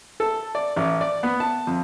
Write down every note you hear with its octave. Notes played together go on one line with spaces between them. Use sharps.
A4
D5
A1
D5
B3
A5
F2